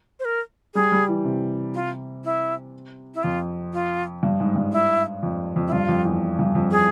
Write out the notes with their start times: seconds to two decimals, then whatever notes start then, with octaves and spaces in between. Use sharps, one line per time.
0.20 C5
0.25 A#4
0.74 G3 G#4
0.92 G3
1.08 E3
1.24 C3
1.74 F4
2.24 E4
3.15 E4
3.23 F2 F4
3.73 F4
4.23 G2
4.40 G#2
4.56 G2
4.72 E4
5.23 F2
5.56 F2
5.68 E4
5.72 G2 F4
5.88 F2
6.05 E2
6.39 G2
6.55 F2
6.71 G#4